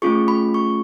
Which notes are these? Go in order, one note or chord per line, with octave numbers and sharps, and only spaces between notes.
A3 C#4 F4 G#4 C#6
B5
C#6